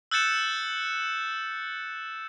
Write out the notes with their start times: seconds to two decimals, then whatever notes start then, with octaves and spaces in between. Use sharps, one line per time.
0.11 E6 F#6 G6 A6 C#7 E7